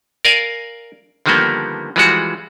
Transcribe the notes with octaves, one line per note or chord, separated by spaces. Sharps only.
A#4 D5 F5 G#5
D3 D#3 F3 G3 A#3 B3
E3 F3 G3 G#3 F4 F#4